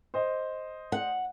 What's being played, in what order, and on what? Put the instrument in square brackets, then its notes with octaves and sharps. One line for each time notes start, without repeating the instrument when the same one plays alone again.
[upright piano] C5 D#5
[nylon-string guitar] F#5